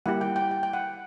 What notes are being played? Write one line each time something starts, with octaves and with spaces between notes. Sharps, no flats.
G3 A#3 E4 G4 F#5
G5
G5
G5
G5
F#5